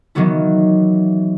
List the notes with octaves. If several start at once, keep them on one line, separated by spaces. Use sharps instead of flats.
D#3 E3 F#3 B3 E4